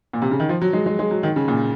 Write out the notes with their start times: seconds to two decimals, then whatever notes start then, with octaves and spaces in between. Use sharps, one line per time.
0.13 A#2
0.22 C3
0.31 C#3
0.40 D#3
0.49 F3
0.61 F#3
0.73 G#3
0.86 G#3
0.99 G#3
1.11 F#3
1.23 D#3
1.36 C#3
1.48 A#2